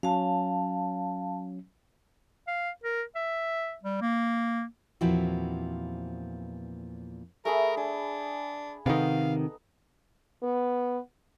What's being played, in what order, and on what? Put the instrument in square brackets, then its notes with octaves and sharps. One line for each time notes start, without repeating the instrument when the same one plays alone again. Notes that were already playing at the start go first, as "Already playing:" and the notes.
[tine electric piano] F#3 C#4 [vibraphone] F5 A5
[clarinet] F5
A#4
E5
G3
A#3
[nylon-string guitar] E2 A#2 F3 C4 E4 F#4
[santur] A3 G#4 B5 [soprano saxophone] A#4
[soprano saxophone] D4 [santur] G#4
[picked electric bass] C3 D#3 [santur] B3 D#4 A4 [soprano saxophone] F5
[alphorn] B3